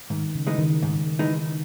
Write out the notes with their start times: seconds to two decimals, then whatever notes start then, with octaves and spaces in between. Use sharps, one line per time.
0.10 G#2 D#3
0.35 C#3
0.47 E3 G#3 D#4
0.58 D#3
0.83 G#2 D#3
1.19 E3 G#3 D#4